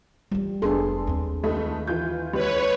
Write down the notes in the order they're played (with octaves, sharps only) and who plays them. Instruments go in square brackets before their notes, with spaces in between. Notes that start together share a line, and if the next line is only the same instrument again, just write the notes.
[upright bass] E3 F4 [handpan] G3
[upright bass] F1 [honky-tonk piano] B3 C6 [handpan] D4 G#4 A4
[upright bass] D#2 C4
[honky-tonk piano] C#2 A3 D#4
E3 F4 G6
[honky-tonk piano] C#2 [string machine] B4 C#5